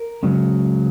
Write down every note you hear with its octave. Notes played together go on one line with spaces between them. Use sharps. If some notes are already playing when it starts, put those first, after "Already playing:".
Already playing: A#4
C#2 C#3 F#3